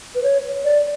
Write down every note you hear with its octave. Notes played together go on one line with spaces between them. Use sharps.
B4
C#5
D5